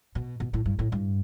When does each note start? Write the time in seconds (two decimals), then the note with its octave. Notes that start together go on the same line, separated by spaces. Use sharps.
0.15 B2
0.40 B2
0.53 A2
0.65 G2
0.79 A2
0.92 G2